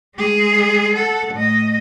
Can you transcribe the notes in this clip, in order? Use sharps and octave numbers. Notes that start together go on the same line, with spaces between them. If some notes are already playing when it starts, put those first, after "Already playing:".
G#3 G#4
A4 F#5
A2 D#5